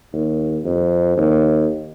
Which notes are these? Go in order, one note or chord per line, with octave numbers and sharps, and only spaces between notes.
D#2
F2
D#2